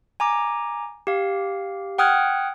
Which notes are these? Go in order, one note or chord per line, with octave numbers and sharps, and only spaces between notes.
G#5 A#5 D6
G4 F5
F#5 G5 D#6 F6 F#6 G#6